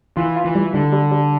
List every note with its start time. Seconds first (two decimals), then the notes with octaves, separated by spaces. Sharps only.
0.17 E3 F4
0.36 F4
0.45 E3
0.55 G3
0.74 D3 G3
0.93 G3
1.12 G3